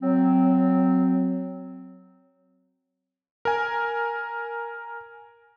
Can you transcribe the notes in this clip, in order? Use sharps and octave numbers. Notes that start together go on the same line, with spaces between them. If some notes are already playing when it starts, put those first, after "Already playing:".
F#3 C4
A#4 G#5